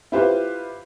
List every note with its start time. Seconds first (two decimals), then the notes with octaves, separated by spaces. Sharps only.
0.12 E4 F4 G4 B4 C5 F5